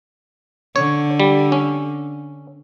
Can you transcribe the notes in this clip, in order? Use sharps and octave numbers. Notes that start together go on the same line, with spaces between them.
D3 C#5
G3
C#4